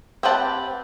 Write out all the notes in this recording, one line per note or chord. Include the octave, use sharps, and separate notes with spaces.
C4 G4 B4 F#5 A5